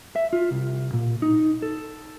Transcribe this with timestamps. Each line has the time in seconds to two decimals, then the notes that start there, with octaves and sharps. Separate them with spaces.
0.16 E5
0.33 F4
0.51 C2
0.93 A#2
1.22 D#4
1.62 A4